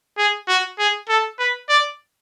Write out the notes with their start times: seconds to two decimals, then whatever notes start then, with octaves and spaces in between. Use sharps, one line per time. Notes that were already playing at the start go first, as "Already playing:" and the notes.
0.18 G#4
0.48 F#4
0.79 G#4
1.09 A4
1.39 B4
1.69 D5